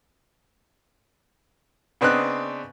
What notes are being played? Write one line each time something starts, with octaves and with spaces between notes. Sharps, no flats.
C#3 B3 C4 D4 D#5 F#6